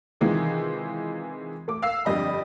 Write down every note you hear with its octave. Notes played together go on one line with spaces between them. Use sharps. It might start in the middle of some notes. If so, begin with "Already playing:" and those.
C3 D#3 E3 G#3 C4 F4
A3 D6
F5 E6 C7
G1 F2 G3 D#5 B5